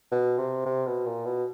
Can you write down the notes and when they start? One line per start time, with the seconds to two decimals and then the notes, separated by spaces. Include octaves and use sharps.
0.12 B2
0.38 C3
0.65 C3
0.87 B2
1.06 A#2
1.26 B2